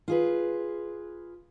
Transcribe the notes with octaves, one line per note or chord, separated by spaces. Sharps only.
F4 G#4 B4